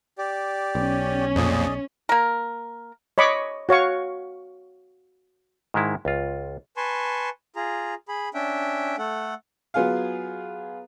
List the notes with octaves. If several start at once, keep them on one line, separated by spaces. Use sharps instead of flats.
G4 D5
B1 C#4
F2 A#2 G#4 D5 D#5
A#3 A#4
C#5 D#5 B5 C#6 D6
F#4 C#5 F5 C#6
G#2 D#3 G#3 E4
C#2 F4
B4 G#5 A5 C6 C#6
F4 G#4 A#5
G#4 B5
C#4 D4 E5 G5
A3 A4 F#5
F#3 B3 F4 G#4 F5